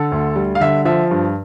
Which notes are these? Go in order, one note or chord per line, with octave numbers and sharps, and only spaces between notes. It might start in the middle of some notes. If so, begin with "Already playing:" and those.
Already playing: D3 A4
D2
G3
F5
D3 E5
F3 E5
G2